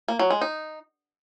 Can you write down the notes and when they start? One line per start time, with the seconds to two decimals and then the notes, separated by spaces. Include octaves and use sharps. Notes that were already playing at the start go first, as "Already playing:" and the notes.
0.08 A#3
0.19 F#3
0.30 G#3
0.42 D#4